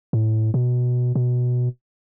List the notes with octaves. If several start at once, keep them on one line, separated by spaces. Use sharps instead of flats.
A2
B2
B2